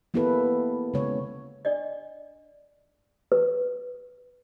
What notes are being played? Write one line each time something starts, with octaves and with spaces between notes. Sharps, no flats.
A#3 B3 E4 G4 A4 B4
C#3 G#3 C#5
D4 D5 D#5
B4